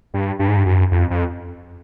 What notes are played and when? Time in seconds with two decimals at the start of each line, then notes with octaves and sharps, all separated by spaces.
0.14 G2
0.39 G2
0.48 G#2
0.56 G2
0.66 F#2
0.91 F2
1.10 F2